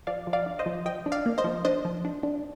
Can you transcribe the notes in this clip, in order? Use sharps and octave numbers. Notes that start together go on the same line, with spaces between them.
F3 D5 F5
F3
D5 F5
D4
C5 D#5
F3
F3 D#5 G5
D4
D5 F5
A#3
C5 D#5
F3
D4 C5 D#5
F3
D4
D4